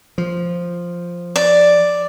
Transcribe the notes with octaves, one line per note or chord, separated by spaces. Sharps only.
F3
D5